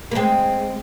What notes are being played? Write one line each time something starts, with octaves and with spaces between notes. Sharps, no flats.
A#3
G#3 C4